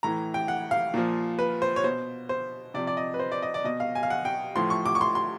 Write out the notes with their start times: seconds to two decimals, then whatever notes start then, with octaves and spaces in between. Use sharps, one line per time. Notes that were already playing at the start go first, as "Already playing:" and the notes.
0.03 A2 E3 A#5
0.34 G5
0.48 F#5
0.71 F5
0.94 A#2 F3
1.39 B4
1.62 C5
1.76 C#5
1.84 B2 C5
2.29 C5
2.74 C3 F3 D5
2.87 D5
2.97 D#5
3.14 B4
3.19 C5
3.32 D5
3.42 D#5
3.54 D5
3.64 B2 D#5
3.80 F5
3.95 G#5
4.03 F5
4.10 F#5
4.25 G5
4.56 A2 F3 C6
4.70 C#6
4.86 D6
4.95 C#6
5.01 C6
5.15 C6